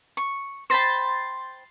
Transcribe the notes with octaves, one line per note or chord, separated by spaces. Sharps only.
C#6
C5 G5 B5 C6 A6